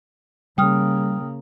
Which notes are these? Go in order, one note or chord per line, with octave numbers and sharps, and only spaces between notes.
C#3 G3 A#3 G5 D#6 F6